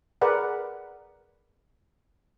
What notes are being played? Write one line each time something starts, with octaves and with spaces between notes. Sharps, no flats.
G#4 A#4 B4 D5 F#5